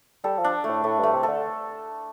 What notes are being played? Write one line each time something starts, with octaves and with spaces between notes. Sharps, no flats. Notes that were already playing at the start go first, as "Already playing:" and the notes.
G3 A4
F3
D4
A3
A2
A2 A3
G2 A3
C3
A4
D3